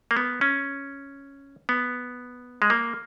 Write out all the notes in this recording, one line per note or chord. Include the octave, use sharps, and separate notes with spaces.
A#3
B3
C#4
B3
G#3
A#3